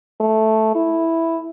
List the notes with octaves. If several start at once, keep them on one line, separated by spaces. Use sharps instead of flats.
A3
E4